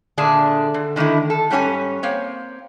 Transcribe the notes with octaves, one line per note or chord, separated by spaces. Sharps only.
A#2 D3 A3 D4 G#4
D3
D3 D#3 A3 D#4 E4
A4
G#2 G3 C#4 C#5 G#5
A#3 C4 C#5